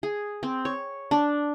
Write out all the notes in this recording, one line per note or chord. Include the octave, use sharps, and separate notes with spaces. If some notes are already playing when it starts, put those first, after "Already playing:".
G#4
C4
C#5
D4